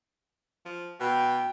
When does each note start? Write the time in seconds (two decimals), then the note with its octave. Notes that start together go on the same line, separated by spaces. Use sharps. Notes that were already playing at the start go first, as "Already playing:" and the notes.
0.65 F3
1.00 B2 G5